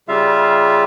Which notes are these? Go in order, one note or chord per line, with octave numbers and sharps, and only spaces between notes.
C#3 G3 F4 E5 F5